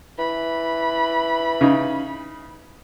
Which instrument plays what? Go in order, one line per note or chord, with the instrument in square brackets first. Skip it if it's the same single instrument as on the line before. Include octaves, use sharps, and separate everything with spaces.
[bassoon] E3 [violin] B5
[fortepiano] C#3 D#4